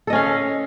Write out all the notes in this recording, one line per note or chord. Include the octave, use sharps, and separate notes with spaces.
C#4 A4 D#5 F5